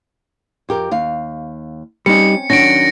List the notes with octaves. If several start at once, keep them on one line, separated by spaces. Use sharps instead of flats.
F2 G4 A#4
D#2 F5
G3 C4 C#4 D#4 C#7
D#3 F#3 C#4 D4 A#6 D7